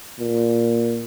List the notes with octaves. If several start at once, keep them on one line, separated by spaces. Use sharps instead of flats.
A#2